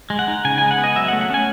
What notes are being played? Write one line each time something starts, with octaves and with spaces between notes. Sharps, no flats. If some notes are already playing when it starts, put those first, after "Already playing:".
G#3
F#5
D#4
C#3 G#5
G#3 G#5
F#5
B3
D#5
F#3 E5
F#5
A3
F#5
C#4 G#5